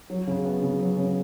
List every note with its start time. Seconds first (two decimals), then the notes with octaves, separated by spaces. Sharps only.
0.10 F#3
0.27 C#3
0.45 B3
0.62 C#3
0.80 F#3
0.97 C#3